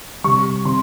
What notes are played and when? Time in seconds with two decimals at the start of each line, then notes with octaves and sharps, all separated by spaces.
0.24 C3 G3 C#6
0.65 C3 C6